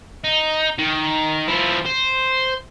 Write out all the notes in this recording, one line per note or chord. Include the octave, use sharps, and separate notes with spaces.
D#4
D#3
F3 E4
C5